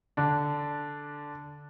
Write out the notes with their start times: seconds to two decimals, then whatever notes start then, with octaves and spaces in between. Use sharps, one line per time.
0.17 D3 D4